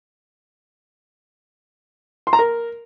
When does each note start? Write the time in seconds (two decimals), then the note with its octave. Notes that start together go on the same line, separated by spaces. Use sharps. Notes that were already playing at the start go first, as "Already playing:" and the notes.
2.27 C6
2.33 A#5
2.39 A#4